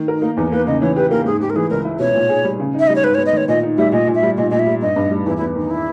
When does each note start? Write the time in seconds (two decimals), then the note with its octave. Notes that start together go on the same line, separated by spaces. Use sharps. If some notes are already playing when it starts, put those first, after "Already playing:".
Already playing: D#3
0.08 A#4
0.15 D#4
0.22 A#3
0.37 E2 D#4
0.52 A#3 B4
0.67 C#3 D#5
0.82 E3 C#5
0.96 G4 B4
1.11 A#3 A#4
1.25 G#2 G#4
1.41 G#2 G4
1.50 A#4
1.56 E3 G#4
1.70 C#2 A#4
1.85 E4
2.00 B2 C#5
2.15 A#2
2.29 G#4
2.44 G3
2.59 C#3
2.74 D#4
2.79 E5
2.87 G3 D#5
2.96 C#5
3.03 G#2 B4
3.15 C#5
3.18 B3
3.26 D#5
3.33 D#3 C#5
3.48 A#2 D#5
3.63 D#4
3.78 G3 E5
3.92 A#2 D#5
4.07 A#2
4.15 E5
4.23 G3
4.38 A#2 D#5
4.51 A#2 D#5
4.59 E5
4.66 G3
4.82 G2 D#5
4.96 G2
5.11 G3
5.26 E2 E4
5.37 E4
5.40 B3
5.55 D#3 D#4
5.71 E4